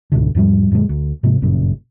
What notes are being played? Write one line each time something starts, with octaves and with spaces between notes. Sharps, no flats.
C#2 G#2 B2 D3
E2 G#2 F3 G3
F#2 A#2 D3 G#3
D2
G#2 C3 F3 A#3
G1 F#2 A#2 C#3